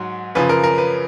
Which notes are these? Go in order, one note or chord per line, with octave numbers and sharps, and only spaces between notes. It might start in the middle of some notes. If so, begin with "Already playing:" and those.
Already playing: G#2 F#3
F#2 C#3 F3 B4
A#4
A#4
B4